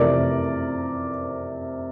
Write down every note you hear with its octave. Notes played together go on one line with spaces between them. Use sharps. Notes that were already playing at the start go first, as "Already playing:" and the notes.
Already playing: F2 C3 E3 A3 A#4 D5